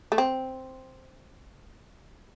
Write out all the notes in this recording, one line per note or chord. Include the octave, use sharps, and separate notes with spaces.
A3
C4